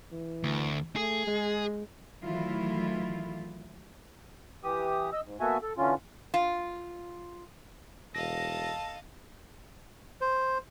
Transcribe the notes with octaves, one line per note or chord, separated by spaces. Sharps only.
E3
D2
A3 G#4
G#3
D#3 E3 F#3 A3 E4 F4
E3 G4 D#6
D#5 E6
G#2
A#3 B3 F#4 A4 E5 G#5
A4
D3 E3 C#4 F4
F4
E1 A4 D#5 F5 A5 A#6
C5